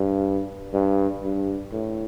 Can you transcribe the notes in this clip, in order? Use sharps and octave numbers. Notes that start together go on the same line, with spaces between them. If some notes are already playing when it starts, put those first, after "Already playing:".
Already playing: G2
G2
G2
A2